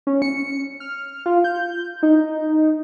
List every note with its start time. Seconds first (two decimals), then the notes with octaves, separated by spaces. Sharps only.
0.07 C#4
0.22 C#7
0.80 F6
1.26 F4
1.44 G6
2.03 D#4